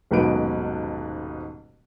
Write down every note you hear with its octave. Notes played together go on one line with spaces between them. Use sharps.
D#1 B1 G#2 B2 B4 D7